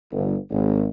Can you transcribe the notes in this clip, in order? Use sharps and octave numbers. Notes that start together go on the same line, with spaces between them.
G1
G#1